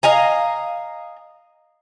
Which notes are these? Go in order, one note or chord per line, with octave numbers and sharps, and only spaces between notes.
D#5 F5 G#5 A#5